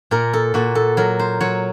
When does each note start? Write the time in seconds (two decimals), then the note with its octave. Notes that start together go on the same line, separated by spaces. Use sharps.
0.11 A#2 A#4
0.33 A4
0.54 A#2 F#4
0.75 A4
0.97 F#3 A#4
1.19 C5
1.41 F#3 C#5